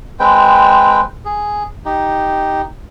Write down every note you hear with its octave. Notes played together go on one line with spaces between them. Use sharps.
G#3 C4 B4 G5
G#4
D#4 G4